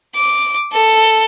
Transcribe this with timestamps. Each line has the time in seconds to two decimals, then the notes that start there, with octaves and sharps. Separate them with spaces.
0.15 D6
0.73 A4